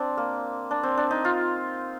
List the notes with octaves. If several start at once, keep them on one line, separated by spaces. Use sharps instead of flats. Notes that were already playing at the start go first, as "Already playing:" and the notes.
Already playing: C4 D4
A#3
D4
C4
D4
D#4
F4